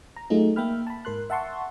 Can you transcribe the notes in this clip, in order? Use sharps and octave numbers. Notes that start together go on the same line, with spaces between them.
A#5
F#3 A3 D#4 F4 G#4
A#3 E5 G5 B5 F6
A5 B5
G#2 A#4 C6 F#6
E5 F#5 A5 C6 C#6